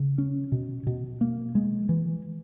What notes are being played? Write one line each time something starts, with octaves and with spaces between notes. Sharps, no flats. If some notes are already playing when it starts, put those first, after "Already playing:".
Already playing: C#3
C#4
B2
B2
A#3
G#3
E3